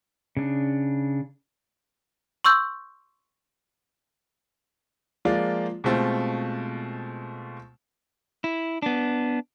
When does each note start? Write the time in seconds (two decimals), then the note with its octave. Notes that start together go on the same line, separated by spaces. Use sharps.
0.37 C#3 D4
2.44 C6 C#6 E6 G6
5.25 F3 G#3 A#3 F4 D5
5.84 B2 G#3 A3 C4 F4
8.44 E4
8.82 B3 D4